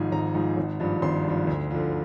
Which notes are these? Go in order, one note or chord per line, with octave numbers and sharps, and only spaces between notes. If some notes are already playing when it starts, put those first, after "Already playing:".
Already playing: G#1 G#2 F3 G#5
G#1 A#5
G#2 F3
G#1
G2 F3
G#1 C6
G2 F3
D2
D3 F3